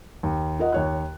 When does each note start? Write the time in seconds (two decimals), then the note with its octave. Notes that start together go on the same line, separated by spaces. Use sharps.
0.23 D#2
0.59 F4 A#4 D#5 F#5
0.72 D#2 C#5 F#6